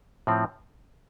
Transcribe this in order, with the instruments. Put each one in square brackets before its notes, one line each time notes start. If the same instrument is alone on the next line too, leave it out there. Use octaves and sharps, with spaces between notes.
[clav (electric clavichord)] A2 F3 C4